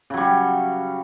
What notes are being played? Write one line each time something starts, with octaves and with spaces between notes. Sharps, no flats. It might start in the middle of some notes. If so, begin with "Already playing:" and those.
C#3 F#3 G3